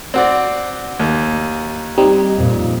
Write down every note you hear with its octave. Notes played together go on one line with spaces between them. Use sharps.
C4 F#4 D5
D#2
G3 C4 D#4
F2 A#2